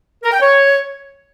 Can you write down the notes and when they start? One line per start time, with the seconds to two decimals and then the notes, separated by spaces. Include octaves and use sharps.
0.23 A#4
0.32 G5
0.42 C#5